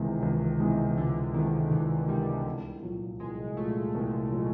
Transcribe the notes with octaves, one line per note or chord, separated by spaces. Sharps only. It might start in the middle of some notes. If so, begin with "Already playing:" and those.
Already playing: C#2 C3 D#3 E3 G#3
C#2
C3 E3 G#3
C#2 D3
C3 D#3 E3 G#3
C#2 E3
C3 E3 G3 G#3
C2
A#2 F#3
C2 G#3
A#2 F#3 A3
C2
A#2 F#3